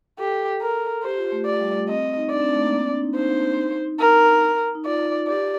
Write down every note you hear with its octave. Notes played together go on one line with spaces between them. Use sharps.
G4 A4
A#4
G4 C5
F4
A3
D5
G3
A3
C4 D#5
D#4
D4 D5
C4
A3
A#3
C4
D4
D#4
D#4 C5
A#4
D#4
F4 D5
G4 D5